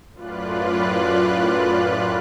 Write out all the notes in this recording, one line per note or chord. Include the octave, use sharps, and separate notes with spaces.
F#2 A2 F4 B4 D5 F#6